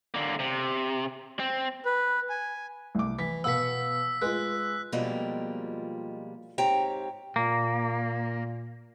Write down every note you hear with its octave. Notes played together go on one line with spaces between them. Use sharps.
D3 A#3
C3
C4
B4
G#5
C2 D6
E3 B6
B2 B3 F5 F#5 E6 B6
G#3 F4 B4 F#6
B2 F3 G3 G#3 A#3 F4
G#2 C4 G4 C#5 G5 A#5
A#2 A#3